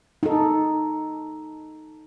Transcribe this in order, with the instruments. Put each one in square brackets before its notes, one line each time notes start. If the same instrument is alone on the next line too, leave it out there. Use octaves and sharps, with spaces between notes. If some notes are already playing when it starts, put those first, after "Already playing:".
[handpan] D#4 A4